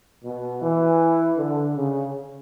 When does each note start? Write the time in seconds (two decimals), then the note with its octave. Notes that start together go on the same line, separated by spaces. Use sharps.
0.24 B2
0.62 E3
1.38 D3
1.76 C#3